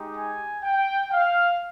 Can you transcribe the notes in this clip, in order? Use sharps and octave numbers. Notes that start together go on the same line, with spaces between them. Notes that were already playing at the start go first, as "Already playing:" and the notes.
Already playing: G#3 D#4 G4
G#5
G5
F5